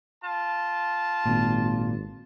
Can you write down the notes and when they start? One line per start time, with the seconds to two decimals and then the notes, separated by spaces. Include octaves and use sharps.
0.24 F4 A5
1.26 G#1 A#2